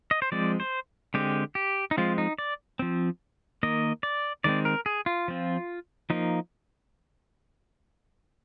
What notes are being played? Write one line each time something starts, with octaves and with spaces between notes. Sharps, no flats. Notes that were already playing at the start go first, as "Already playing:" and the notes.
D#5
C5
F3 G#3 C4 D5
C5
D3 G#3 C4 G4
G4
D#4
F3 G#3 C4 F4
D#4
D5
F3 C4
D#3 A#3 D#5
D5
D#3 G#3 C4 D5
A#4
G#4
F4
F3 C4
F3 A#3 D#4